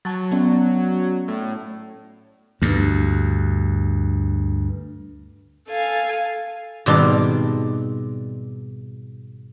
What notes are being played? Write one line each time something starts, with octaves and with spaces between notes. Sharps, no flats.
F#3 A5 C#6 A6
B3 C#4 D5
A2
D2 G2
A4 F5 G#5
G#2 B2 D#3 G3 C4 D4